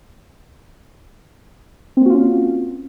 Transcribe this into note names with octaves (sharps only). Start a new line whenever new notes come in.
A#3 C4 C#4 F4 F#4